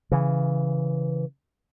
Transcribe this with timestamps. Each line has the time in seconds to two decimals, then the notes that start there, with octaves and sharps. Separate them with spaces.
0.12 C#3 E3